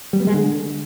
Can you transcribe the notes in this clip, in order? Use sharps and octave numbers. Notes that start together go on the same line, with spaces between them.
G3
B3
G#3
D3